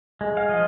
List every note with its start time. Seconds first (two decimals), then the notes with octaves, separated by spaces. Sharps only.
0.21 G#3
0.37 F5
0.49 F3 D#5